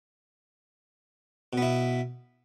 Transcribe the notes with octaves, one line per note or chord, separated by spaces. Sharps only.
B2 B3 E4